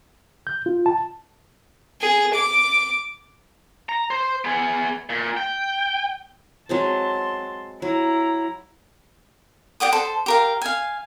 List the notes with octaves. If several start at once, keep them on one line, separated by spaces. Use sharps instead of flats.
G6
F4
A5
G#4
D6
A#5
C5
B3 G#4
A#2
G5
F#3 G#3 C4 A5 C6
F#3 E4 A#5
G4 D5 F#5 D#6
A4 C5
G4 A#4 F5
F5 G#5